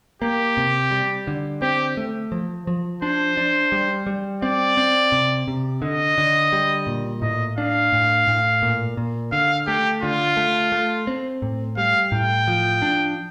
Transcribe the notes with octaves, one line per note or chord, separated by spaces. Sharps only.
A#3 G4
C3
G3
D3
C4 G4
A3
F3
F3
D4 C5
D4
G3
G3
C4 D5
C4
C3
C3
D3 D#5
D3
G3
A#2
A2 D#5
D4 F5
A2
A2
A#2
A#2
D3 F5
A3 G4
D3 F4
A3
A3
C4
A2
G3 F5
A2 G5
F3
D4